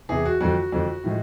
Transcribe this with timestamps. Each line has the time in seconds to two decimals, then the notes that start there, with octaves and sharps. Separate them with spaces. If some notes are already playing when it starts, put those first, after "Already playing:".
0.09 E2 C3 E3 G#4
0.25 F#4
0.40 F2 D3 F3 F#4
0.72 F2 D3 F3
1.04 A2 F3 G#3